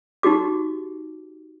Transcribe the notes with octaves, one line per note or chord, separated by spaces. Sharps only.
D#4 F#4 G4 D6